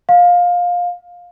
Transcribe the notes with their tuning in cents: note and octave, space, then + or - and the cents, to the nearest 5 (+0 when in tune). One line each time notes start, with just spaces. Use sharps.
F5 +20